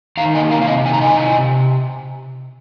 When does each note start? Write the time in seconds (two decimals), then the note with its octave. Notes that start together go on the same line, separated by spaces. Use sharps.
0.17 D#3 F5 A#5
0.35 A#3 D#5 G#5
0.51 C3 F5 A#5
0.62 F5
0.68 C3 D#5 G#5
0.85 D#3 G#5
0.93 A#5
1.01 A#3 D#5 G#5
1.18 C3
1.35 C3